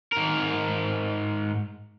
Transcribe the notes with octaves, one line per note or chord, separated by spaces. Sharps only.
G#2 A#4